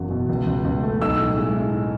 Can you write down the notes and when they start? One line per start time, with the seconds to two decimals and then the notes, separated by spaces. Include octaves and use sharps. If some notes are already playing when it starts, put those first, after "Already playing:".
Already playing: F#1 E2 F#3
0.10 B2
0.29 C#2
0.47 C#2
0.64 C#2
0.83 A3
1.01 B1 E6
1.19 A2
1.38 G#3
1.56 A2